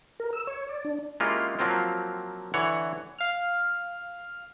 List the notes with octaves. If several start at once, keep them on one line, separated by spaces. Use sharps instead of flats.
A#4
E6
C#5
D5
D4
G#3 A#3 C#4 E4 F4 G4
F3 F#3 A#3 C4 F4
D3 E3 C#5 F#5
F5 F6